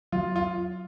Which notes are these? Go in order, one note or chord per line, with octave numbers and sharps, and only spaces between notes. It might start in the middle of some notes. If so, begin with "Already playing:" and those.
F#3 F4
F4